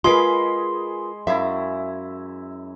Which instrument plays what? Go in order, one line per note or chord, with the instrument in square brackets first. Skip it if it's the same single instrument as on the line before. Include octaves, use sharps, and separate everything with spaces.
[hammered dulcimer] G#3 G#4 B5 [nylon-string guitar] F4 A#4 B4 [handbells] C6
[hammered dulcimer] F#2 E4 [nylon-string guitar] E5 F5